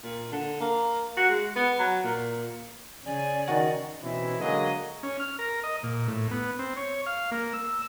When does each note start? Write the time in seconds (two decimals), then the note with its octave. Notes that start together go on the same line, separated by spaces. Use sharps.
0.04 A#2
0.32 D3
0.61 A#3
1.17 F#4
1.29 G#3
1.56 B3
1.79 F#3
2.04 A#2
3.05 C#3 D5 G#5
3.48 D#3 F#4
4.01 B2 E3 C4 C#4 D#4 E4
4.39 D3 F#3 G#3 A#3 G#4 D#5
5.03 C#4
5.20 F6
5.39 A#4
5.64 D#5
5.83 A#2
6.08 A2
6.31 B3
6.59 C4
6.76 C#5
7.06 F5
7.31 A#3
7.53 E6